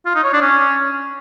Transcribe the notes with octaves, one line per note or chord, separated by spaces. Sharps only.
F4
D#4
C#5
D4
C#4